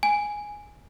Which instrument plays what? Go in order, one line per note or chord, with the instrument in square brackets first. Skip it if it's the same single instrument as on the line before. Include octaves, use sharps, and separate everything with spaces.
[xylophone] G#5